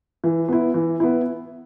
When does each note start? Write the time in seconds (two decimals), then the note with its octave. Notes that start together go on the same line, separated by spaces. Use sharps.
0.24 E3
0.48 B3 E4
0.74 E3
1.00 B3 E4